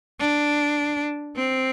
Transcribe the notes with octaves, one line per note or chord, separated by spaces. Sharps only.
D4
C4